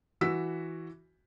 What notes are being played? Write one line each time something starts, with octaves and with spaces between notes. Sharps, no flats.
E3 F#4 E6 B6